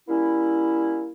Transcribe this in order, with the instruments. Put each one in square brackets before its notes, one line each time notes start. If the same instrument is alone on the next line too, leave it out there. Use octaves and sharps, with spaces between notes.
[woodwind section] G3 A#3 C#4 E4